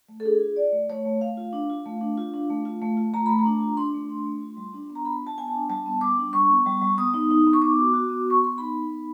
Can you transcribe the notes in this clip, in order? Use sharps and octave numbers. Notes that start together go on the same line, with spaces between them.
A3
A4
D4 G#4
F4
F4 D5
A3
A3 C#5
A3
A3 F5
F4
D4
F4
A3
D4
F4
D4
A3
F4
A3
F4
A3 A#5
A3 B5
A#5
D4
F4
D4 C6
A3
D4
A3
F4
G3
D4
B3
A#5
D4 B5
F4 A5
B3 G#5
A5
D4
G3 A5
B3
G3 D6
D4
G3 C#6
B3
G3
G3
B3 D#6
D#4
D#4
B3
C#6
B3 D6
F#4
F#4
B3
B3 C#6
B3 C6
D#4 B5
D#4
B3